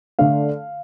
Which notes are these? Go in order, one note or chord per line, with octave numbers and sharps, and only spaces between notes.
D3 A3 D4 F5